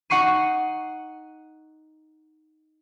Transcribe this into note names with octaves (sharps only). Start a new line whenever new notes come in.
D#4 F#5 C#6 C7 D#7